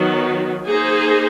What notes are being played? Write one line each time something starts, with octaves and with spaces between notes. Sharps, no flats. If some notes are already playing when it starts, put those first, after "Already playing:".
Already playing: D#3 F#3 B3
A#3 D#4 G#4 C5